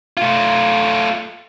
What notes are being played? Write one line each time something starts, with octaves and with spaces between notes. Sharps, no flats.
A3 F4